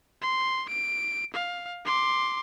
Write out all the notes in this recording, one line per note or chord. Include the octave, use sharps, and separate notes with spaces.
C6
D7
F5
C6 D6